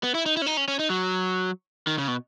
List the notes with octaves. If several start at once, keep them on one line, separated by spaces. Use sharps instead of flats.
B3
E4
D#4
E4
C#4
D#4
C#4
C#4
D#4
F#3
D#3
C#3
B2